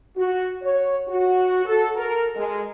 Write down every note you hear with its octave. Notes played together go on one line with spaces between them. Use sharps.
F#4
C#5
F#4
A4
A#4
G#3